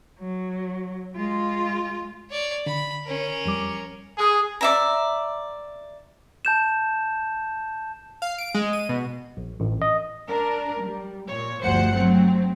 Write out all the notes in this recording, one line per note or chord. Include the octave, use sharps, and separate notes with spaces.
F#3
G#3 F4
C#5 D5
D3 B5
C#4 A#4
F2 G3 D6
G#4
D5 E5 A#5
A5 G6 E7
F5
D7
G#3
D#7
B2
A#1
A1
D#5
D4 A#4
G3
A#2 C#5
G1 D2 F3 C5 F#5 C#7
F#3 A3 C4